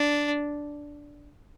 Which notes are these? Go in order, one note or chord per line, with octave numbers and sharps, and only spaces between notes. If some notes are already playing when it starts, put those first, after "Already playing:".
Already playing: D4